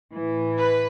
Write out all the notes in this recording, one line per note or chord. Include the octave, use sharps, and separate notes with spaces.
A2 E3
B4